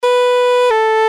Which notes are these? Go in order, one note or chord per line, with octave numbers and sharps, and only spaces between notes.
B4
A4